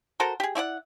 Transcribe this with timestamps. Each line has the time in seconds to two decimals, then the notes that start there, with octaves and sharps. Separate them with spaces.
0.20 F#4 A4 A#4 C5
0.40 G4 G#4
0.55 A3 E4 D5 F#5